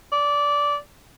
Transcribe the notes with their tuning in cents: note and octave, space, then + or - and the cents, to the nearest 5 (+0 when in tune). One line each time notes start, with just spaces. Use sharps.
D5 -15